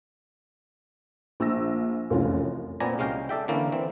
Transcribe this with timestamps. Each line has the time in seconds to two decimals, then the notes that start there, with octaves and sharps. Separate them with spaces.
1.40 A#1 E6 A#6
2.10 F1 C2 F#2 E3 F4 C#5
2.80 A#2 B3 C4 D5 G#5 A#5
2.98 C2 G#3 C#4 F5 G5 A#5
3.29 A4 D5 E5 G5
3.48 D3 E3 A#3 C#4 E4
3.72 E3 C4